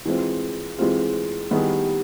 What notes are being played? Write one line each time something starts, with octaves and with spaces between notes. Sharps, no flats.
E3 G#3 C4 F4
E3 G#3 C4 F4
D#3 G3 B3 E4 G#4